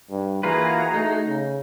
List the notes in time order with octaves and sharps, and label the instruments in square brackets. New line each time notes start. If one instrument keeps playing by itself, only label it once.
[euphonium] G2
[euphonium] E3 [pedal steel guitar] A#3 F4 B4 [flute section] F#4 G#4 A#5
[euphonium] A3 [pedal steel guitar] D#4
[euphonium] C#3